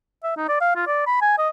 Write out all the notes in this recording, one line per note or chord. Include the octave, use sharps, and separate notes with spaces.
E5
D#4
D5
F5
F4
D5
B5
G#5
D#5